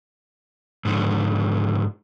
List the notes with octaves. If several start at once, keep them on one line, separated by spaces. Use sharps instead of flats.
G#2 D3 F3